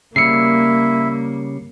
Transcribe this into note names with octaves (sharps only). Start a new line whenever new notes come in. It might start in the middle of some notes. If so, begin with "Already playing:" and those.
C#3 G3 A#3 E4 C7 C#7